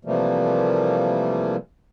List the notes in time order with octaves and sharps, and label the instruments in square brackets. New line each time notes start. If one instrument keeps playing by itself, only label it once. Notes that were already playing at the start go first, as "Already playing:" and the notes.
[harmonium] C3 E3 F3 G3 A3 A#3